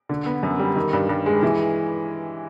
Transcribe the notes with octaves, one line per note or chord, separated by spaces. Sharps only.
D3
B3
F#2
G3
D#3
G2
G2
G#3
E3